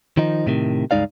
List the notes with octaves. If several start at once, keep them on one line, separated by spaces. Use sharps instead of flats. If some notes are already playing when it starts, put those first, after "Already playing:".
D#3 F3 D#4
A2 C3 D#3
C#2 G2 G#3 D#4 D5 F5